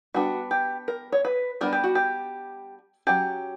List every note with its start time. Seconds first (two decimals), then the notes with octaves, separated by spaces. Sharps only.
0.14 G3 B3 D4 F#4
0.51 G4
0.88 A#4
1.12 C#5
1.25 B4
1.61 G3 B3 D4 A#4
1.73 G4
1.84 F#4
1.95 G4
3.07 F#3 C#4 G4